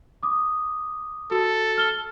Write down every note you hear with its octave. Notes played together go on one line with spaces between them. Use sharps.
D6 D#6
F#4 A4
F6 G7